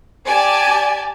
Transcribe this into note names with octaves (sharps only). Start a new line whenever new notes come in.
G4 D5 G#5 A5